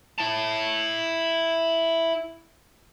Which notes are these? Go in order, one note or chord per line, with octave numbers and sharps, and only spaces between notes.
E4 A5